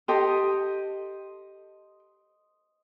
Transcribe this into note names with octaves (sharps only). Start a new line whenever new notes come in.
G4 A4 D#5 C6 D#6